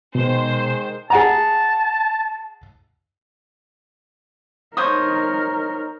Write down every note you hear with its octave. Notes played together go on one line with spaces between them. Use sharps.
B2 D#3 G#3 C5
G#4 F#5 A5 A#5
D#4 A#4 C5 C#5 D#6